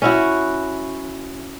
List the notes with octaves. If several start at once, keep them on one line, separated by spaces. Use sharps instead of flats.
C#4 E4 F#4